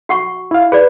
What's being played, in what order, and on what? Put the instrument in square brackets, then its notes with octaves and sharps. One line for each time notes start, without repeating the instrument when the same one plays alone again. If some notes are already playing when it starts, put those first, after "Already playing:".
[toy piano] F#4 F#5 C#6
[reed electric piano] E4 F5
[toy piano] G#4 D5 [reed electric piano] B4